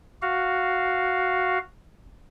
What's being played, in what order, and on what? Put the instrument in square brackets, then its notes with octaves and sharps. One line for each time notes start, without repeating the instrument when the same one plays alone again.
[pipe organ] F#4 F5